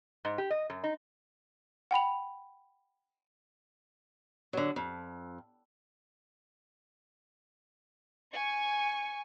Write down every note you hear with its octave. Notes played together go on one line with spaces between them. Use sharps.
G#2
G4
D#5
F#2
D#4
F#5 G5 B5 F7
D3 F#3
F2
G#5 C#6